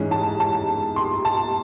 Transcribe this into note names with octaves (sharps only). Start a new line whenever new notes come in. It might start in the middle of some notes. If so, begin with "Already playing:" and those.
Already playing: G#2 E3 G#3 C#4
A5
A5
C6
A5